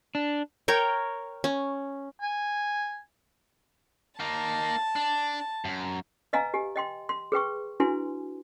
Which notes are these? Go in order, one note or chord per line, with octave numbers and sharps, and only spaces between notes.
D4
A#4 C#5 G5
C#4
G#5
A#3 D#4 A5
D4
F#2
B4 D#5 F5 G#5 A#5
G4 G#5
D#5 G5 C6
C6
G#4 B4 G5 C#6
D4 E4 F#4 B4 G#5 C6